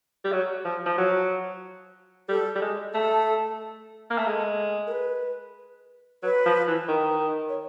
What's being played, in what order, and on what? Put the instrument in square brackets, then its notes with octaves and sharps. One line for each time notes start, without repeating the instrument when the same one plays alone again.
[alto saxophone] G3
F#3
F3
F3
F#3
[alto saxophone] G3 [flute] A4
[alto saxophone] G3
G#3
[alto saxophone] A3 [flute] A4
[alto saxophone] A#3
A3
[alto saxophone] G#3 [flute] A4
[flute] A#4
B4
[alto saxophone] F#3 [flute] B4
[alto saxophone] F3
E3
D#3
[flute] C#5